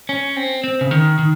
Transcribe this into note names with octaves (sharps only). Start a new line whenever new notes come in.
C#4
C4
C4
C#3
D#3
D#3